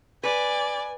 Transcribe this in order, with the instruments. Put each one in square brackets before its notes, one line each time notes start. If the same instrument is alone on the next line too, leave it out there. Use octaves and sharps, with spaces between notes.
[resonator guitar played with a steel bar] B4 [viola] D5 [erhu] G#5